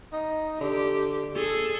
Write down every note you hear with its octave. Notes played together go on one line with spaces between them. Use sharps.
D#4
D3 G4
G#4 A4